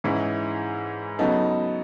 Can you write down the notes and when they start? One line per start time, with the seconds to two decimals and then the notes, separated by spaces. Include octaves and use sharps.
0.04 G#2 E3 G#3 C#4 E4
1.19 C#3 F#3 B3 D#4 A4